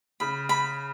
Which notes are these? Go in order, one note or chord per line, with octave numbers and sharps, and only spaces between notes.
C#3 B5
B5